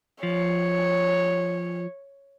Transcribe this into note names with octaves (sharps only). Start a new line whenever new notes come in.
F3 C#5